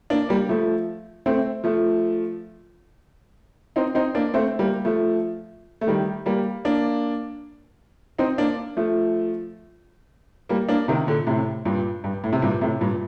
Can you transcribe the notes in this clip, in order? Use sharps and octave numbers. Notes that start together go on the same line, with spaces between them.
A#3 D4
G3 A#3
F3 A3
A3 C4
F3 A3
C4 D#4
C4 D#4
A#3 D4
A3 C4
G3 A#3
F3 A3
A3
D#3 G3
G3 A#3
A#3 D4
C4 D#4
A#3 D4
F3 A3
G3 A#3
A#3 D4
C3 D#3
A#2 D3
A2 C3
G2 A#2
G2
A2
C3
G2 A#2
A2 C3
G2 A#2